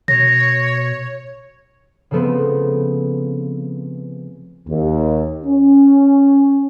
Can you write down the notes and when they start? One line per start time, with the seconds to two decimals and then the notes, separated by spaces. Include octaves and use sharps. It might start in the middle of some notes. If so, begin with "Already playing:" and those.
0.08 B2 C#5 A#6
2.11 C#3 F3 A3 B3 C4
4.68 D#2
5.45 C#4